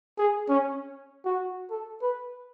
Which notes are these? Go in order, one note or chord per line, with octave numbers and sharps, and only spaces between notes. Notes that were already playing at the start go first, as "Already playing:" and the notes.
G#4
C#4
F#4
A4
B4